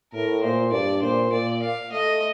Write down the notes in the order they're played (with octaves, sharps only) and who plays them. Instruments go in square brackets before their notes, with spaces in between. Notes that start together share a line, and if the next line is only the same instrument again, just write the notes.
[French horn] A2 [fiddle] A#4
[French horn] A#2 [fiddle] C5
[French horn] G2 [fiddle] D5
[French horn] A#2 [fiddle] C5
[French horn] A#2 [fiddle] D5
[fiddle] F5
[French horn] A3 [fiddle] D#5